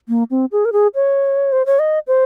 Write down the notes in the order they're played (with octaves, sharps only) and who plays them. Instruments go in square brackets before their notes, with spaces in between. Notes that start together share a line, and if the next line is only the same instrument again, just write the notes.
[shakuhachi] A#3
C4
G#4
A#4
G#4
C#5
C5
C#5
D#5
C5